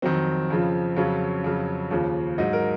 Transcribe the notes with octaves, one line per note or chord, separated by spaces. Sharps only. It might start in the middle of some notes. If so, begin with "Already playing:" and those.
F2 D#3 F#3 C4
F2 C#3 F3
F2 C#3 F#3 C#4
F2 C#3 F#3
D#2 C#3 F3
G#2 F#3 D#4
A#4